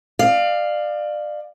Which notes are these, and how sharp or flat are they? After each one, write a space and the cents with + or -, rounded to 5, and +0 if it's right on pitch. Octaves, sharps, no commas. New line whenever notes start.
D5 +30 F5 +0